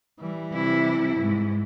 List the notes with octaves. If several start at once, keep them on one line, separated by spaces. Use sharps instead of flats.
E3 G3
C3 E4
G#2